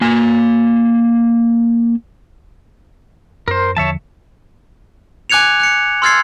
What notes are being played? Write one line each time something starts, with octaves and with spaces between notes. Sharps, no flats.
A#3 G#5
F#2 A#4 C5
E2 D3 F3 C#5 E5 A5
G#5 D6 F#6 G#6 C#7 F7
F#6 C#7
C6 E6 F6 G#6 A6 C7